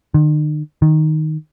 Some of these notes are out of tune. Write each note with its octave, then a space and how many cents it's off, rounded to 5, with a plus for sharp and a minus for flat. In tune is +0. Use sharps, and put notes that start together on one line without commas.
D#3 -45
D#3 +0